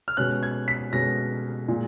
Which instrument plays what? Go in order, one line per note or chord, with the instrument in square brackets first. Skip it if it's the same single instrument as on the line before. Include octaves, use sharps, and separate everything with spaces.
[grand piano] F6
B2 G#3 C#4 F#6
G#6
B6
B2 G#3 C#4 A#6
A#2 G#3